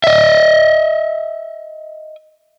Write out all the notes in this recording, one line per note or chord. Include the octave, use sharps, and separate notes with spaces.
D#5 E5